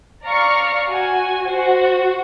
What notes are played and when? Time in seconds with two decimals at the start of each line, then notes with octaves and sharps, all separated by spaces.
0.24 D5 F5 A#5 C#6 F6
0.89 F#4 G#5
1.50 F#4 C5